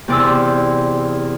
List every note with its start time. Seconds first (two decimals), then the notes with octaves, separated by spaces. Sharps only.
0.08 E2 C3 D5 C6 E6